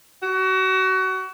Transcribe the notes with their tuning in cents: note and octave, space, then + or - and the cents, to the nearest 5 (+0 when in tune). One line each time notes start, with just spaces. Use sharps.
F#4 +30